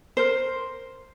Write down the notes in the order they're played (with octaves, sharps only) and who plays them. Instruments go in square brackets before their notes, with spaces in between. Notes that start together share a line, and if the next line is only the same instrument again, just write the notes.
[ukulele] A#4 C5